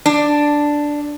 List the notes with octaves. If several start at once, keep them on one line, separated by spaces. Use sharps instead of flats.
D4